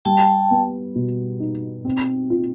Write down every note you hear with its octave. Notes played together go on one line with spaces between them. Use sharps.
G3 G5 A5
B3
B2
D#4
C4
F4